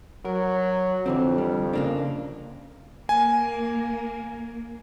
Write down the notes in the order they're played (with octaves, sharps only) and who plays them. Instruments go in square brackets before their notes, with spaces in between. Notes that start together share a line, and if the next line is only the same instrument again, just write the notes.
[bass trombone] F#3 [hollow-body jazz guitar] A#4
[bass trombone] F2 [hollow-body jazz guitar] D3 E3 C4
[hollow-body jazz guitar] G3
C#3 A#3 D4
[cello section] A#3 [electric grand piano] G#5